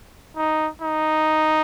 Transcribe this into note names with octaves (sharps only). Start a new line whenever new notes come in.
D#4
D#4